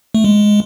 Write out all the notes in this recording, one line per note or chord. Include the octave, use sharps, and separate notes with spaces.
A3
G#3